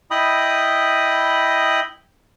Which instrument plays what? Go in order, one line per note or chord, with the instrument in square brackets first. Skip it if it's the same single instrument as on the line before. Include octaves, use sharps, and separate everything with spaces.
[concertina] E4 D#5 G5 B5 D#6